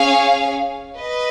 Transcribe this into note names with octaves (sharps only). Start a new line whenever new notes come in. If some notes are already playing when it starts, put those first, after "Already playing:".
Already playing: C#4 G#4 C#5 F5
B4 D#5